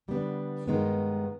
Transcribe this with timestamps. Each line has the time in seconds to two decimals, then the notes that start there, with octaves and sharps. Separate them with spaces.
0.08 D3 G3 B3 D4
0.68 G2 D#3 G#3 B3